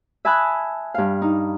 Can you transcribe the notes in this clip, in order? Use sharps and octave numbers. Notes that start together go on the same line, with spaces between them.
E5 G#5 A5 B5 D#6 F#6
G2 F5
D#4